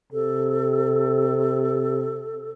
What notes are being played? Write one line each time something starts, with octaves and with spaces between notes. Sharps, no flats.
C3 A4